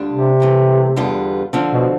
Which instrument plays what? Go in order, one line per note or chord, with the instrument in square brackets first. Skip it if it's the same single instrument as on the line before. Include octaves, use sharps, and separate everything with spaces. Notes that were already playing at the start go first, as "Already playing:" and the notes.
Already playing: [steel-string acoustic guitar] D2 D3 G3 D4 F4
[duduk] C3
[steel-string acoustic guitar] G2 E3 A3
E2 D3 G3 B3 F4
D3 F3 C4
[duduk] B2